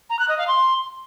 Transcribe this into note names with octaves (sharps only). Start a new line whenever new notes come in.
A#5
F#6
D#5
F5
C6